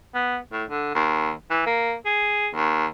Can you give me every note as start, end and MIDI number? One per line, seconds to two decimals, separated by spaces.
0.14 0.37 59
0.52 0.64 45
0.70 0.92 50
0.95 1.32 39
1.50 1.62 52
1.66 1.94 58
2.06 2.48 68
2.55 2.86 39